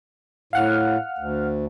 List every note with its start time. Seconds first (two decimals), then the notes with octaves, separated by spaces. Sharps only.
0.53 A2 F5 F#5 F6
1.18 D2